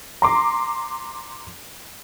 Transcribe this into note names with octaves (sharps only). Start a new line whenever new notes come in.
A#5 C6 D6